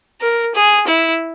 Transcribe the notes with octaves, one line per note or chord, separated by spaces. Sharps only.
A#4
G#4
E4